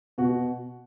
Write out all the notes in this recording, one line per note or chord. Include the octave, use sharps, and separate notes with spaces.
B2 F#4